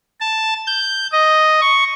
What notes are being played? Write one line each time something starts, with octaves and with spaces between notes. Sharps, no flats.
A5
G6
D#5
C#6